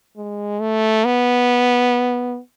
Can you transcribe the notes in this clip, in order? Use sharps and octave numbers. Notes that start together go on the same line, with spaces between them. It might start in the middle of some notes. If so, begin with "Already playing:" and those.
G#3
A3
B3